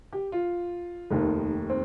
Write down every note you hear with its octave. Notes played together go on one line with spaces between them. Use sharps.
G4
F4
F1 D#2 D#3
C4